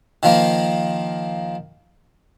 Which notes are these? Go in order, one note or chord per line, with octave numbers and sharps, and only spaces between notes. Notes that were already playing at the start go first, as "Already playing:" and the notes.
D#3 F3 A#3